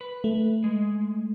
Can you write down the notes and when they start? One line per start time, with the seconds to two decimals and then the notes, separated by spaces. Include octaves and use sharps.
0.01 B4
0.24 A3
0.64 G#3